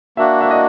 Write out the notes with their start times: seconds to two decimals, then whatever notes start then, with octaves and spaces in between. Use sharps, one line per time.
0.17 A#3 D4 F#4 E5
0.41 E5
0.51 D#5